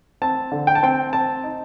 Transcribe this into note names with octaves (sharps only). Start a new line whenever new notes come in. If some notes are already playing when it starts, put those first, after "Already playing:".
C4 A5
D3
G5
A5
C4 G5
C4 A5
D#4